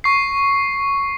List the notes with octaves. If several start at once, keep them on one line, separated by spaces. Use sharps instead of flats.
C#6 C7